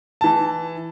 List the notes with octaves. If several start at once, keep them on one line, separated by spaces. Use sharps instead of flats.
E3 A5